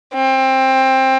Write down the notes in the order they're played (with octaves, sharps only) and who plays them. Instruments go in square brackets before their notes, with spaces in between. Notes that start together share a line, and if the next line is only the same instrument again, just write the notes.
[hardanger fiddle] C4